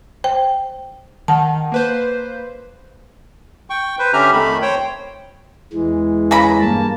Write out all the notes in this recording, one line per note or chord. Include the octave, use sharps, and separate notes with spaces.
C5 G5
D#3 F#5 A5
A#3 B4 C5
G5 C#6
B4 C5
D3 C#4 G4 E5 A#5 F6
F2 D#3 A3 B5
C5 C#5 G5
E2 E3 G#3
C#3 A#5 B5
G2 A#3 A5